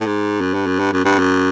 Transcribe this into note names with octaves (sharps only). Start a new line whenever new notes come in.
A2
G#2
F#2
G2
F#2
G2
F#2
G2
F#2